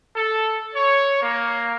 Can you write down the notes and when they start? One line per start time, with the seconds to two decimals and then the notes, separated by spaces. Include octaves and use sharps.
0.15 A4
0.75 C#5
1.21 A#3